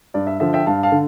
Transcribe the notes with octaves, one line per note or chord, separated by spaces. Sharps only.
G2 D5
E5
D3 F3 E5
E5 G5
G2 F5 A5
F5 A5
D3